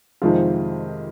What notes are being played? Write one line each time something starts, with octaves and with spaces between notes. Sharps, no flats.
F2 C3 D#3 G#3 C4 F4